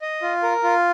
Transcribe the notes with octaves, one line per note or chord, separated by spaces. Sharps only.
D#5
F4
A#4
F4